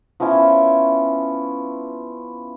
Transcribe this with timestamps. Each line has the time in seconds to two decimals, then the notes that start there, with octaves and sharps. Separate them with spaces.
0.20 F3 B3 C#4 E4